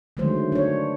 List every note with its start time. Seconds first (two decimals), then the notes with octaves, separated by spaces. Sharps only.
0.17 D3 D#3 F#3 G#3 A3 C5
0.52 D4 C#5